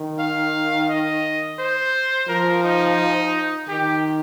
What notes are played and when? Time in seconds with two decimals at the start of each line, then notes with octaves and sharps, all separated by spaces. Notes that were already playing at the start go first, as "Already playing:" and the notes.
Already playing: D#3
0.19 F5
0.89 D#5
1.59 C5
2.28 F3 A#4
2.63 D#4
3.68 D#3 G4